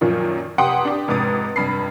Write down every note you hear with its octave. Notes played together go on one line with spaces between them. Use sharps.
F#2 A#2 D#3 F3
F1 G4 F#5 G5 C6 D#6
D4 G4
F1 G#2 D6 D#6 A6
F1 G2 B5 C7